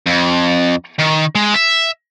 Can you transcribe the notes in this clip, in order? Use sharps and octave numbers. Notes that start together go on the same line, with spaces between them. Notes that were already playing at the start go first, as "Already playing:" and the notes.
F2
D#3
G#3
E5